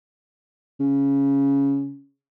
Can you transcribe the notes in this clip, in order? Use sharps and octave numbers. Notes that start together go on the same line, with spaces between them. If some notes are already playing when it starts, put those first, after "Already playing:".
C#3